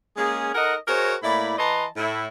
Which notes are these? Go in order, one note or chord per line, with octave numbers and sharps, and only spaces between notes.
G#3 A#3 C#4 G#4
D#4 A4 A#4 D#5 F#5
F#4 G#4 A#4 C5 C#5 D#5
A2 A#3 E4 D5 B5
E3 B4 D#5 A5 A#5 C6
A2 E4